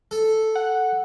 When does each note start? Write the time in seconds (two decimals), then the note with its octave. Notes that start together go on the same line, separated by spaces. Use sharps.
0.11 A4
0.55 F#5